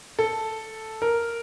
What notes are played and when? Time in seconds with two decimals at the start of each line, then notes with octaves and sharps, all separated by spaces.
0.19 A4
1.02 A#4